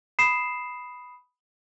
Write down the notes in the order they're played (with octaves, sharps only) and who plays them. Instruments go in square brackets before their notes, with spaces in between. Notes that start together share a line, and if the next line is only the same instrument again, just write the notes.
[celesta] B5 D#6 C7 E7